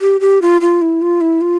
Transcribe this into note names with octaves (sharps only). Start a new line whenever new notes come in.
G4
G4
F4
F4
E4
F4
E4
F4